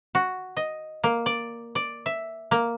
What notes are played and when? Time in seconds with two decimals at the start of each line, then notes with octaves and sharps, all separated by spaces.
0.15 F#4
0.57 D#5
1.04 A#3
1.26 D5
1.75 D5
2.06 E5
2.51 A#3